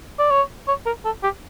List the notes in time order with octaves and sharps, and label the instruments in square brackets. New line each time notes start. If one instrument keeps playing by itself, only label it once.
[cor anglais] D5
C#5
C#5
A#4
A4
G4